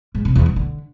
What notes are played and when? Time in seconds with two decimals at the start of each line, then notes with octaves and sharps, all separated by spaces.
0.15 G#2
0.25 C3
0.35 E2
0.46 G2
0.56 D3